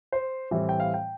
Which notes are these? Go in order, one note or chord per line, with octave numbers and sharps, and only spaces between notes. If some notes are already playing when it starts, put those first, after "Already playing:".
C5
A2 E3 G3 C4
G5
F5
G5